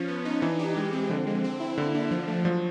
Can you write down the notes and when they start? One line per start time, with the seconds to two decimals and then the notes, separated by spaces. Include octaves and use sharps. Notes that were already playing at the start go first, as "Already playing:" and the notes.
Already playing: F3 C#4
0.08 B3
0.25 D#4
0.42 E3 D4
0.59 G4
0.77 G#3
0.93 C4
1.10 D3 F3
1.27 G#3
1.44 C4
1.60 E4
1.78 D3 A#3
1.95 D4
2.11 F3
2.28 A3
2.45 F3 F#3